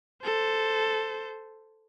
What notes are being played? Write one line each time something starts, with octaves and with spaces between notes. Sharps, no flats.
A4 C5